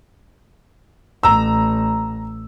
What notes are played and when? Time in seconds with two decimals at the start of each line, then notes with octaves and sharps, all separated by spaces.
1.23 A1 A#5 E6